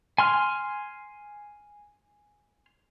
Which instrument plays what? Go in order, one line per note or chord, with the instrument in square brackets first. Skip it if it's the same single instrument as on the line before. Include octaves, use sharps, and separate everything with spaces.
[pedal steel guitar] G#5 C6 F6